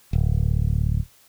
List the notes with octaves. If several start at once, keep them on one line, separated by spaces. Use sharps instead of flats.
D1